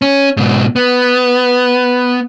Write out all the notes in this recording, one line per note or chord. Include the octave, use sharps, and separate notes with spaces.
C#4
G#2 B2
B3